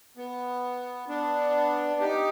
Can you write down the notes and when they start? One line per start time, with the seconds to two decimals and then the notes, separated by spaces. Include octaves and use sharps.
0.17 B3
1.09 B3 D4
2.00 D#4 G4